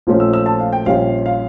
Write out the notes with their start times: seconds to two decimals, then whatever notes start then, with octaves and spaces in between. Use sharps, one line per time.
0.07 A#1 A#2 F3 A3 C#4
0.20 E6
0.33 E6
0.46 A5
0.60 F5
0.73 G5
0.86 A#1 A#2 G3 C#4 F5
1.26 F5